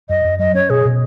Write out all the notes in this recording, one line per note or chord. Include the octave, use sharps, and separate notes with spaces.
F#2 D#5
F#2
F#3 D#5
C#4 C#5
B2 G#4
B2